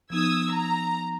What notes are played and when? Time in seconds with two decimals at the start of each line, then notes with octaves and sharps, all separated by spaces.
0.10 F3 B3 D#4 D#6 E6 G#6
0.54 A#5